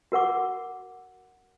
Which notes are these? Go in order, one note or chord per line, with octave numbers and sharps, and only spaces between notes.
F#4 A#4 F#5 D6